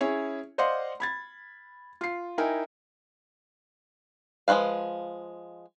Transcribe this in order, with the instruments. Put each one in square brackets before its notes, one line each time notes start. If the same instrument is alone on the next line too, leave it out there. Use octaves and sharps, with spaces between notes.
[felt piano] C#4 E4 G#4 C#5
C5 D5 D#5 F5 F#5 C6
B5 G#6 A6
F4 C7
D#4 E4 A#4 G5 G#5
[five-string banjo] F3 G#3 F#4 B4 F5